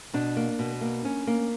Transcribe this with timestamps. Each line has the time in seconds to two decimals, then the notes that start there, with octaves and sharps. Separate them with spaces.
0.13 B2 D4
0.37 A#3
0.59 B2
0.81 A#3
1.05 C#4
1.27 A#3